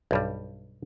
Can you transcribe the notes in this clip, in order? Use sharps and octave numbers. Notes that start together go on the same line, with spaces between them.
B1 G2 G3